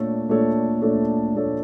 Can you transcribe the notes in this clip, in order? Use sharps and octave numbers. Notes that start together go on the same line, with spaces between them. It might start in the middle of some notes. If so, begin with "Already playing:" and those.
Already playing: A#2 A3 D4 A4 C#5
A#2 A3 D4 A4 C#5
A#2 A3 D4 A4 C#5
A#2 A3 D4 A4 C#5